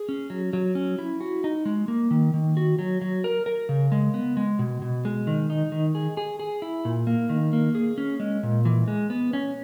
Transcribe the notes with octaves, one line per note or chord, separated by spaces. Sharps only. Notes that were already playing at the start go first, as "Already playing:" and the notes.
Already playing: G#4
C#4
F#3
F#3
C#4
E4
F#4
D#4
G#3
A#3
D#3
D#3
F#4
F#3
F#3
A#4
A#4
C#3
G#3
B3
G#3
B2
B2
G#3
D#3
D#4
D#3
G#4
G#4
G#4
E4
A#2
A#3
D#3
A#3
G#4
C#4
G#3
A#2
E3
G#3
B3
C#4